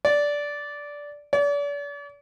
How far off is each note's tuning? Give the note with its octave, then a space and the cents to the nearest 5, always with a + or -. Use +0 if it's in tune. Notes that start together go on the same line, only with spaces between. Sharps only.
D5 -10
D5 -40